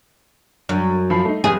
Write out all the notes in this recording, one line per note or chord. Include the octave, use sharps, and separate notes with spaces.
F#2 D3
F3 B5 C7
A3 D#4
F1 G4 G#4